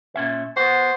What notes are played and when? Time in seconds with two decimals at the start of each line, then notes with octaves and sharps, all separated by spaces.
0.16 A#2 C#4 E5
0.57 B3 F#4 C5